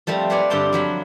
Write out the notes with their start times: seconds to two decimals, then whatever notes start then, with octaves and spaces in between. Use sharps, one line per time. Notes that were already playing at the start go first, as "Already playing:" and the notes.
0.07 F3 G3 A3 C4
0.30 B4 C5 D5 F5 F#5 G#5
0.50 G2 D3 C4 G4 G5 A5
0.73 F3 F#3 B5